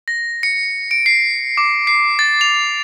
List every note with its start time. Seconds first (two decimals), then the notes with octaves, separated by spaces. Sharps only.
0.08 A#6
0.43 C#7
0.91 D7
1.06 C7
1.57 D6
1.87 C7
2.19 A6
2.41 F7